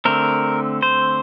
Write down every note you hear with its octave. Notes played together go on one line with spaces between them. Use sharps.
D3 A3 C4 A#4
C5